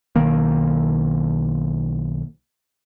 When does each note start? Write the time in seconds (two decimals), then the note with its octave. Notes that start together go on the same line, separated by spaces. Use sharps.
0.16 B1 D#3 A#3